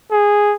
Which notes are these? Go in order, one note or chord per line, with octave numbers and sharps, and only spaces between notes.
G#4